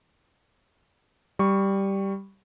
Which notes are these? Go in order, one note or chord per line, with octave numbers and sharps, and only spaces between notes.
G3 C#6